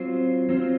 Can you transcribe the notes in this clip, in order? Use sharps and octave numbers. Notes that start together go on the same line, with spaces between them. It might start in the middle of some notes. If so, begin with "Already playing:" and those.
Already playing: F#3 C4 F4 C5
F#3 C4 F4 C5